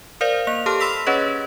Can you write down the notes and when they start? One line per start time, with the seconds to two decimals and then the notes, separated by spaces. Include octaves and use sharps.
0.21 A#4 C5 D5 F5
0.47 A#3 F7
0.66 G4 A4 A5 C6 F6
0.80 B5 C6 E6 B6 F7
1.07 C#4 G#4 B4 C#5 D#5